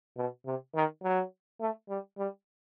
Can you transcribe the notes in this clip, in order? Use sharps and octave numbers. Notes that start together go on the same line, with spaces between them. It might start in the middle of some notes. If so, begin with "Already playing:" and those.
B2
C3
D#3
F#3
A3
G3
G3